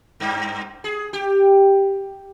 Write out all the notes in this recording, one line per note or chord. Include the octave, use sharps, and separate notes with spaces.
G2
G#4
G4